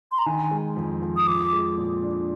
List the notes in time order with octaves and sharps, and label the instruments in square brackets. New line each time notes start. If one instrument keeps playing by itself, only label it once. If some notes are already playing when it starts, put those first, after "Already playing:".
[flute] C6
A#5
[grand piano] D#3 [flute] G#5
[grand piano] G#3
F2
F2
[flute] D#6
[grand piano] F3 [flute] D6
[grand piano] G#3
A#2
D4